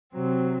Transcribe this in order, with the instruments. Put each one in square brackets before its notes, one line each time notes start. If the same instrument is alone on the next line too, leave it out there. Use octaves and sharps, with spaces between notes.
[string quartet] C3 F#3 C4